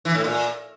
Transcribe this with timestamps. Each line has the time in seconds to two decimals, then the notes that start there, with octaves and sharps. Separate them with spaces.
0.05 E3
0.15 A2
0.24 A#2